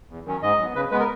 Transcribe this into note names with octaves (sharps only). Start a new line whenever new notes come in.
E2
D#3 F#3 C#4
G#2 D#5
F#3 B3
C#3 B4
G#3 B3 B4
A#4